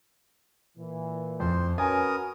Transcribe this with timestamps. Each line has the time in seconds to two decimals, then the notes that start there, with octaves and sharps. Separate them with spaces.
0.77 A#2 E3
1.40 F2 C5
1.78 C#4 F#4 A#4 B4 G#5 D#6